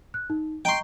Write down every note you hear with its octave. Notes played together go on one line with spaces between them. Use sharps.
F#6
D#4
D#5 G5 A#5 C6 C#6